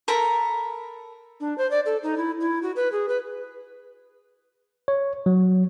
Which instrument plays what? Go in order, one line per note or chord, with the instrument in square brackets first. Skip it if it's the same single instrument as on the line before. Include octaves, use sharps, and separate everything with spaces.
[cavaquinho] A4 A#4 A#5 B5
[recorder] D4
C5
D5
A4
D#4
E4
E4
F#4
B4
G#4
B4
[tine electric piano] C#5
F#3